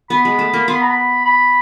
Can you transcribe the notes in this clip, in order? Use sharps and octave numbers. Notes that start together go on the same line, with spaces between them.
B3 B5
G#3
A3
A#3
B3 C6
B5
A#5
B5
B5